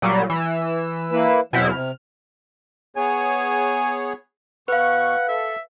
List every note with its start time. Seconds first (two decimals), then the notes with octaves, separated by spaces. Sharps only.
0.02 A#2 F#3 G3
0.30 E3 E6
1.12 A#3 E4 B4
1.53 E2 B2 F#3 C4 E4
1.70 C3 F6
2.96 B3 G#4 C#5 G#5
4.68 B2 B4 F5 F#5 C#6
5.28 A4 E5